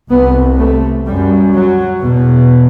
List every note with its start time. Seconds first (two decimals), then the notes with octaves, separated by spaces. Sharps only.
0.10 C2 C3 B3
0.58 A3
1.06 F#2 G3
1.53 F#3
2.01 E2 B2